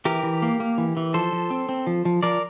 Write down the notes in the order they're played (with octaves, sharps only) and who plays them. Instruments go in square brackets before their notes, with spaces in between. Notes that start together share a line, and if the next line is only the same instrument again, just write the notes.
[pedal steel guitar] E3 G4 A#4
E3
A#3
A#3
E3
E3
F3 A4 C5
F3
C4
C4
F3
F3
F3 A#4 D5